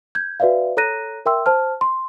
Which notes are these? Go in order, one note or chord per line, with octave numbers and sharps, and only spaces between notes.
G6 G#6
F#4 B4 D5 E5 F5
A4 C#5 A#5 F#6 A#6 D#7
A#4 E5 G5 C6 E6
C5 A5 F6
C6